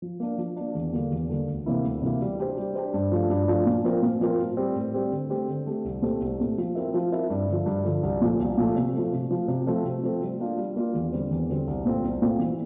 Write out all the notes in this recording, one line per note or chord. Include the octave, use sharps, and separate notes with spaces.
F3
A#3 D4
F3
A#3 D4
E2
D3 G3 A#3
E2
D3 G3 A#3
D2
C3 E3 A#3 E4
D2
C3 E3 A#3 E4
G3
D4 G4 C5
G3
D4 G4 C5
G2
F3 A3 D4 F4
G2
F3 A3 D4 F4
A#2
F3 C4 F4 A#4
A#2
F3 C4 F4 A#4
A2
G3 C4 G4
A2
G3 C4 G4
D3
A3 C4 G4
D3
A3 C4 G4
C2
A#2 A3 C4 G4
C2
A#2 A3 C4 G4
F3
C4 E4 A#4 E5
F3
C4 E4 A#4 E5
G2
D3 F3
G2
D3 F3
C2
A#2 F3 A3
C2
A#2 F3 A3
C3
F3 A3
C3
F3 A3
C3
F3 A3 C4
C3
F3 A3 C4
G3
A#3 D4 F4
G3
A#3 D4 F4
E2
D3 G3 C4
E2
D3 G3 C4
C2
A#2 A3 C4 F4
C2
A#2 A3 C4 F4
E3